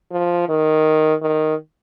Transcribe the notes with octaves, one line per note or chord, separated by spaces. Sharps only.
F3
D#3
D#3